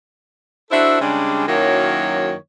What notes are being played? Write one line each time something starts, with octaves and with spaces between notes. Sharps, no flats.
D4 E4 F#4 A4 C5 E5
C#3 G3 G#3 D4
F#2 D#3 F#3 A#3 E4 C#5